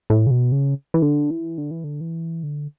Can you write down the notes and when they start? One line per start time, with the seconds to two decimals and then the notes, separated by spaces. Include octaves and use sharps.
0.10 A2
0.27 C#3
0.31 B2
0.52 C#3
0.94 E3
1.02 D3
1.31 E3
1.58 D3
1.71 E3
1.84 D3
2.01 E3
2.43 D3